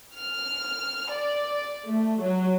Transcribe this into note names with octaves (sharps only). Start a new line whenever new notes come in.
F6
D5
A3
F#3